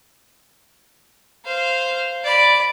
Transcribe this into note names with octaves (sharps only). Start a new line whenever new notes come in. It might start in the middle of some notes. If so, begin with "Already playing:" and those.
C5 F5
D5 B5